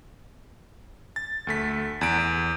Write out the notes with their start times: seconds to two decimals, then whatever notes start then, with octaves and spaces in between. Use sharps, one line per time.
1.16 A6
1.47 D2 A3 B6
2.01 E2 D7
2.18 E2